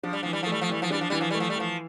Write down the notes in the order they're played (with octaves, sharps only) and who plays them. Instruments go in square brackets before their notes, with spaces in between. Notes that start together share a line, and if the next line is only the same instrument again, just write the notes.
[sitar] F3 [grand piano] D4
[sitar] G3
[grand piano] E3 [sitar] F3
[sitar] G3
[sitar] F3 [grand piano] A3
[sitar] G3
F3
[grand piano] E3 [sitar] G3
[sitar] F3
[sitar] G3 [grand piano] D4
[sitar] F3
[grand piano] E3 [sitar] G3
[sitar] F3
[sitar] G3 [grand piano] A3
[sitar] F3
G3
[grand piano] E3 [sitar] F3